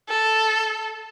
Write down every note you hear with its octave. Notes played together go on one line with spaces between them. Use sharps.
A4